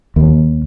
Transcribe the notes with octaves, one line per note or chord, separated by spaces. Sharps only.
D#2